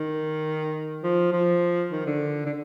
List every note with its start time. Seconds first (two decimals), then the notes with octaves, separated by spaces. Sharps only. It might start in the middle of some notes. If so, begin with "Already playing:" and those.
Already playing: D#3
1.03 F3
1.33 F3
1.91 D#3
2.06 D3
2.46 D3